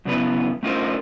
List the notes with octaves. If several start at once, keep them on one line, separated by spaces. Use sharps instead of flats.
F#2 C#3 E3 B3 B4
A3 C#4 D#4 F4 A#4 C5